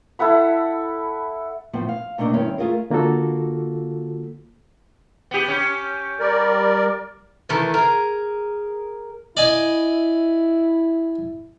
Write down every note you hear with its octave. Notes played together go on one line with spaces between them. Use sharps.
E4 A4 F#5 B5
A2 F3 B3 C4
F5
C3 A3 A#3 D4 D#5
G2 D#3 C4 C#4 E4
A3 F4 G#4 A#4
D3 A#3 F4 F#4 A4
B3 G4
C#4 G4
G3 A#4 D5
D#3 E3 A3
G#4 A#4
E4 D5 D#5 G#5